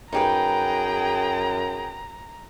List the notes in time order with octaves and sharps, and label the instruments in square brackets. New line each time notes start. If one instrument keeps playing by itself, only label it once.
[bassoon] F#2 [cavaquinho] D#4 G4 B4 [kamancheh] G#4 G5 [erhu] A#5